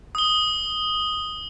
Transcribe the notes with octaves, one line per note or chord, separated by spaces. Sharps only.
D#6 G7